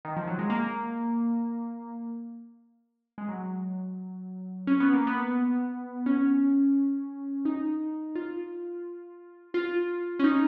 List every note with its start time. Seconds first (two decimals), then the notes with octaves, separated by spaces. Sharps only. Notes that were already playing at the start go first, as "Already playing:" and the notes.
0.05 D#3
0.17 F3
0.27 F#3
0.39 G#3
0.50 A#3
3.18 G#3
3.28 F#3
4.67 C#4
4.80 B3
4.94 A#3
5.07 B3
6.06 C#4
7.45 D#4
8.15 F4
9.54 F4
10.20 C#4
10.24 D#4